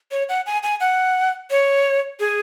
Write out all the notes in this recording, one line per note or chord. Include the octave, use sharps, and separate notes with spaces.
C#5
F#5
G#5
G#5
F#5
C#5
G#4